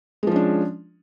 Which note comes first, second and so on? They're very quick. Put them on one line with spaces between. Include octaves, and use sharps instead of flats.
G#3 F3 C#4 D4